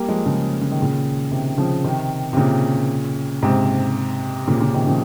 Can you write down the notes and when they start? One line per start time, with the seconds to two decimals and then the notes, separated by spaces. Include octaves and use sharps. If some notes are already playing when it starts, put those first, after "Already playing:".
Already playing: G3 A#3
0.08 F3 G#3
0.26 C#3 F3
0.61 C#3
0.72 D#3
0.82 A#2 C#3
1.31 C3 D#3
1.58 C#3 F3
1.84 C3 D#3
2.33 C3
2.37 A#2 C#3
3.43 G#2 C3
4.48 A#2 C#3
4.61 A#2 C#3
4.74 C3 D#3
4.87 C#3 F3